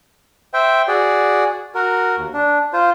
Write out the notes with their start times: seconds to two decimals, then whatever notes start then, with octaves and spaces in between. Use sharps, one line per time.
0.54 C5 E5 G5
0.88 F#4 G#4 D5
1.75 F#4 A#4
2.17 D#2
2.34 D4
2.73 F4 C5